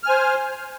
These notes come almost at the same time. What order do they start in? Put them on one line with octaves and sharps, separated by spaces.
F6 G#5 C5